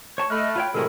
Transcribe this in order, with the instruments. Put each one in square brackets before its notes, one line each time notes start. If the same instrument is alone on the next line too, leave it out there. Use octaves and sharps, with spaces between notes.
[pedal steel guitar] C#5 A5 C#6
[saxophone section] A3 [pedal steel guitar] D#5 [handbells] B5 F6 F#6
[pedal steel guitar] F4 C#5 G5 [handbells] B5
[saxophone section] A2 C3 G#3 [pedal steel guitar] D#3 F#3 [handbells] A4 A#4